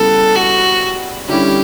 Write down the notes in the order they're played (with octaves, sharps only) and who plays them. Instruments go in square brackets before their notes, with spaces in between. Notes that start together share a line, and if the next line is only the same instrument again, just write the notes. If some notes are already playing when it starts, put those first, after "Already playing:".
Already playing: [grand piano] C#3 G3 B3 E4 [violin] A4
[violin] F#4
[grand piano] D3 G3 C#4 E4 [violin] G4